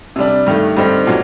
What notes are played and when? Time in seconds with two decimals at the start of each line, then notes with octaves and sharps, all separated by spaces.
0.16 C3 G3 D4
0.47 G2 D#3 A3
0.77 G2 D3 G3 C4 D#4
1.07 A#2 F#3